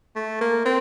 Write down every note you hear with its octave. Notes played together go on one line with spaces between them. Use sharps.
A3
A#3
C4